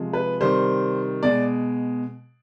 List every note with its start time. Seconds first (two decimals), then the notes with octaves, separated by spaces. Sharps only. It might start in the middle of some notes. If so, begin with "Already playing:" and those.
Already playing: C3 F3 G#3
0.13 B4
0.41 C3 D#3 G3 C5
1.23 B2 G#3 D5